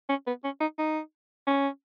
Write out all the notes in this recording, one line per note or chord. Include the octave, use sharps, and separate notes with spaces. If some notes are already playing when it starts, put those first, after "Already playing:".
C#4
B3
C#4
D#4
D#4
C#4